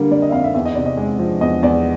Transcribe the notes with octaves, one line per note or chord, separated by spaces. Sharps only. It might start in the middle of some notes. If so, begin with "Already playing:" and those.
Already playing: D3 G3 A#3
A#3 D5
D#5
E5
F2 F5
E5
E2 E5
D#5
C3 D5
D#5
G#3
F3
E2 D#5
E2 D5